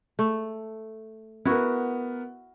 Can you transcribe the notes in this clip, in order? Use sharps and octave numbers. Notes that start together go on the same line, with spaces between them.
A3
B3 E4 F#4 A#4